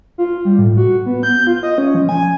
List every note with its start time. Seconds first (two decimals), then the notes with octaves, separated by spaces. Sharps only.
0.18 F4
0.45 G3
0.59 A2
0.77 F#4
1.06 B3
1.23 G6
1.47 F4
1.63 D#5
1.78 C#4
1.95 F3
2.09 G#5